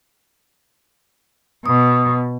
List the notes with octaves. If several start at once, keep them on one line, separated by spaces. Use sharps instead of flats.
B2 D#6